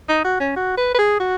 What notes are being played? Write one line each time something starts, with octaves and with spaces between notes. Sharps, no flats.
D#4
F#4
C#4
F#4
B4
B4
G#4
F#4